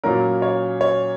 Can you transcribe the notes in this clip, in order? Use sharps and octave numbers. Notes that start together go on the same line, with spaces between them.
A#2 F#3 A#3 C#4 A#4
C#5
C#5